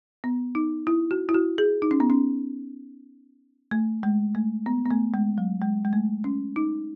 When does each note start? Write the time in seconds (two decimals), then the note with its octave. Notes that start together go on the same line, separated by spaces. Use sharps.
0.24 B3
0.55 D#4
0.87 E4
1.11 F#4
1.29 E4
1.34 F#4
1.58 G#4
1.82 D#4
1.91 C#4
2.00 B3
2.10 C#4
3.71 A3
4.03 G#3
4.35 A3
4.66 B3
4.85 B3
4.90 A3
5.14 G#3
5.38 F#3
5.62 G#3
5.85 G#3
5.93 A3
6.24 C#4
6.56 D#4